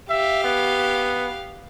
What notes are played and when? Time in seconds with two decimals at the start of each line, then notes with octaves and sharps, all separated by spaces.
0.10 G4 E5 F5
0.44 B3